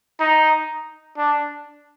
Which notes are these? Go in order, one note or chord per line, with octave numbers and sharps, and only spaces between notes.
D#4
D4